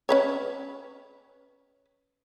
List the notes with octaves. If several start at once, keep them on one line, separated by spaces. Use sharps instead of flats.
C#4 B4 C#5